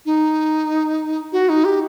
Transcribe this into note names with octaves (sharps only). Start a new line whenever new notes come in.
D#4
F#4
D#4
G4